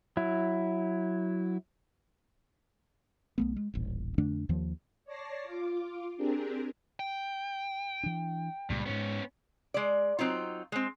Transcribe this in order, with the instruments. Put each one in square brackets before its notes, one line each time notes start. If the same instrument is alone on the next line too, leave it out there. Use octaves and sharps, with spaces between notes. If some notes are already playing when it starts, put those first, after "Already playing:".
[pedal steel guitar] F#3 E4
[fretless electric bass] B1 A3 B3
G#3
D#1 A1
F2 D3 A3 D4
D#2 D#3 F3
[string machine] C#5 D5 A5 A#6 C7
F4 D6
C4 D4 G4 G#4 A#4
[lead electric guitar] G5
[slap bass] E3 D4
[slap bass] C#2 A#2 G#3 [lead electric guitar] G2
[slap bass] G#2 G#3 [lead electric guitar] B3 C#4
[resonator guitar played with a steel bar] G#3 D5
F#3 C4 D#4 F4
G#3 C4